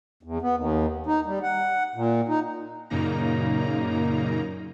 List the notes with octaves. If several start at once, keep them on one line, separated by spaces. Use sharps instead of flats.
E2
B3
D#2
D#4
G3
F#5
A#2
D#4
F#2 A#2 C#3 A#3 D#4 A#5